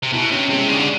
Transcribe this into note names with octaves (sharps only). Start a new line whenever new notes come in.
C3
B2 E4
C3 C#4
C3 G#3
C#3 D4
D3